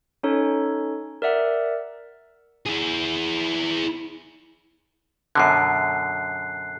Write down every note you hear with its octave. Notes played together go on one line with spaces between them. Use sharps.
C#4 D#4 A4 C#5
A#4 D5 E5 F#5
E4 G#4
F#2 B2 D3 F#6 C7